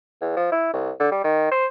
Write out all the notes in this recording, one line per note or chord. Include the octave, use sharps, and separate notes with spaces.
E2
F3
E4
C2
D3
G3
D#3
C5